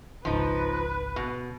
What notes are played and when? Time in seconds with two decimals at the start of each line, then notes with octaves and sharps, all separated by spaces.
0.25 G#1 C#2 F3 D#4 B4
1.16 B2